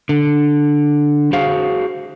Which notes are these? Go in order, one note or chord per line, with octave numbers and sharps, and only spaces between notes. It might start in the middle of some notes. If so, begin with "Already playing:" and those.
D3
F#4 G#4 C5 F5